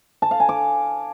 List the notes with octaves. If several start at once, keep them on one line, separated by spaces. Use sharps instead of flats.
A5
F5
G#5
D6